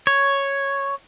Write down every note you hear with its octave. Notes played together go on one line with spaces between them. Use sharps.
C#5